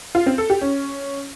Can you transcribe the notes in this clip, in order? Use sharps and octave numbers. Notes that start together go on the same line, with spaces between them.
F4
C4
A4
G4
C#4